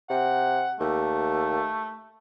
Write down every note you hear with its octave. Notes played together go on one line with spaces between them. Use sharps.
C3 F#5
D#2 A3